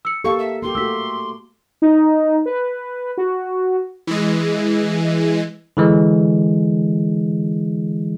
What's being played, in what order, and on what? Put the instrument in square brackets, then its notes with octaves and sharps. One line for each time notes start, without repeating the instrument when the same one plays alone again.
[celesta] E6 C#7
[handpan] A#3 A4 [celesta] G4 F5 [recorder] C#6
[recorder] E5
[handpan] A#3 G4 [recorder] C6
[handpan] A3 F#4 G4 [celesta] E6 B6
[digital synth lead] D#4
B4
F#4
[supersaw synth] E3 G#3
[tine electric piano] D3 E3 G#3